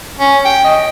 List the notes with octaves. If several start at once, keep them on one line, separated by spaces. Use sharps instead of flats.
C#4
G5
D#5